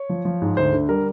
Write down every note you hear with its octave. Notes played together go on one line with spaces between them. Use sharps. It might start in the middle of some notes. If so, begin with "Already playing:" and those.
Already playing: C#5
F3
F3
G#2
D2 C5
D3
G3 A#4